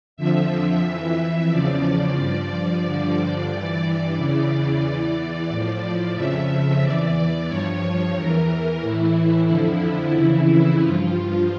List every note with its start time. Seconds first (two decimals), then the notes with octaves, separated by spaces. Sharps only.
0.17 F2 D3 F3 E5
0.83 F2 E3
1.50 E2 C#3 F3 D5
2.17 G2 F3 D5
2.82 G2 D3 F3
3.50 G2 E3
4.15 E2 C#3 E3 D5
4.83 E2 E3
5.49 A2 F3
6.15 F2 C#3 F3 E5
6.82 E2 E3 D5
7.48 G2 F3 C#5
8.15 E2 E3 A#4
8.81 A2 E3 E4
9.48 F2 D3 F3
10.14 F2 C#3 E3
10.80 G2 F3 F4